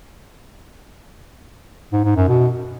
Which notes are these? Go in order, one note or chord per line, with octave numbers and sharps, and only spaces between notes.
G#2
G#2
F#2
B2